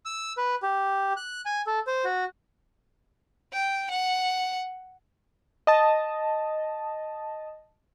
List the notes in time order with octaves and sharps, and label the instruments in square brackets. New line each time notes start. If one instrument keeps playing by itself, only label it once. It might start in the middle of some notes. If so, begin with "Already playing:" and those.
[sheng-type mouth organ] E6
B4
G4
F#6
G#5
A4
C5
F#4
[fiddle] G5
F#5
[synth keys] D#5 A5